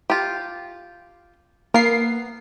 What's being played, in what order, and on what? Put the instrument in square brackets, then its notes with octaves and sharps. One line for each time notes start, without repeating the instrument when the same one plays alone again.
[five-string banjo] F4 G4
[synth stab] A#3 C7 [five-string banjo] B3 A#4